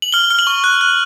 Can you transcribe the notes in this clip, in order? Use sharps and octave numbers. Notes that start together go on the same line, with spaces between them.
F#7
F6 G7
F6
F#7
C#6
F#6
F#6